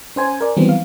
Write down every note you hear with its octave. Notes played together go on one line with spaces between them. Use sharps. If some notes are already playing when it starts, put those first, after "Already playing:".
C#4 C5 G#5
A#4 D5
D#3 E3 F#3 G3 B3 C4
F5